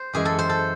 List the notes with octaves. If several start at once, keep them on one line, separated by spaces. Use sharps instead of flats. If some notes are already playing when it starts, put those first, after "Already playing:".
Already playing: C5
F#2 E3 G#3 G#4
A4
C5
A4